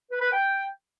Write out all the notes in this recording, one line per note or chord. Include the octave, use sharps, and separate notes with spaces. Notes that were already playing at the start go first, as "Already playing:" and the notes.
B4
B4
G5